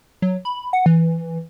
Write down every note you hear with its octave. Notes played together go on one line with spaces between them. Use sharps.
F#3
B5
F#5
E3